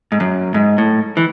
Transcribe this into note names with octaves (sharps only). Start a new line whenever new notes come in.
G#2
F#2
G#2
A2
E3